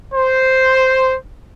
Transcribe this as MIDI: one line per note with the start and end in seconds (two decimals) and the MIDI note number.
0.13 1.13 72